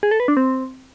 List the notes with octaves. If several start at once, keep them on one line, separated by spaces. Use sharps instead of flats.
G#4
A4
B4
D4
C4